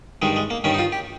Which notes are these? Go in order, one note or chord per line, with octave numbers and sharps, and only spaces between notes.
G2 D#3 G3 G#3
G#3
A#3
G2 D#3 G3 C#4
D#4
F4
G4